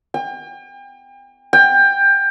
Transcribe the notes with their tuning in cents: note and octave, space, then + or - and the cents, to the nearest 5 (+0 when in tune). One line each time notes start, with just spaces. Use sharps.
G5 +40
G5 +20